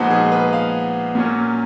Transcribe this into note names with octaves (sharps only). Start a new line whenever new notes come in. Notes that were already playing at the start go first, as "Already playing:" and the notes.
Already playing: A#2 F3 G#3 B3 D#4 F#4
G#4
B4
F5
A#2 F#3 A#3 C#4